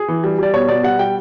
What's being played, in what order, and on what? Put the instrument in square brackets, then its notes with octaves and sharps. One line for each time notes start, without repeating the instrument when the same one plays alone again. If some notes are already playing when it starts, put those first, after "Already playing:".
Already playing: [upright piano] G#4
E3
G3
G3 D5
B2 C#5
B2 D5
G3 F#5
G3 G5